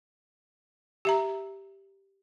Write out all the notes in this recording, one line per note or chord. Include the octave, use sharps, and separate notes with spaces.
G4 E5 A#5